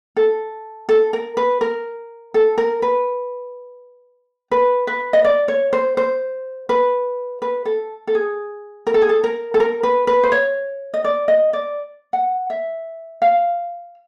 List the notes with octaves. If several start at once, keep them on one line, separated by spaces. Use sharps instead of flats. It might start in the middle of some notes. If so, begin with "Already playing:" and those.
A4
A4
A#4
B4
A#4
A4
A#4
B4
B4
B4
D#5
D5
C#5
C5
C5
B4
B4
A4
A4
G#4
A#4
A4
G#4
A4
A#4
A4
A#4
B4
B4
C5
C#5
D#5
D5
D#5
D5
F#5
E5
F5